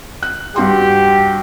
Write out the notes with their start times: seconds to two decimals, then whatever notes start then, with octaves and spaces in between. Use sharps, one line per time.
0.23 F#6
0.56 G2 F#4 G4 C6